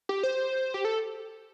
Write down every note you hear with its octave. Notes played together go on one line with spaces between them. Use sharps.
G4
C5
G4
A4